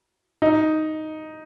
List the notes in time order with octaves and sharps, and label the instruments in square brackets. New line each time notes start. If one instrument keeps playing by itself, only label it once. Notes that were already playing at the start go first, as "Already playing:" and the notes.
[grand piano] D#4